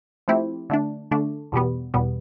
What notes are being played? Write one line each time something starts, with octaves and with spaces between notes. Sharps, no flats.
F3 A3 C4 E4 G4
D3 A3 D4
D3 A3 D4
E2 B2 G3 B3
E2 B2 G3 B3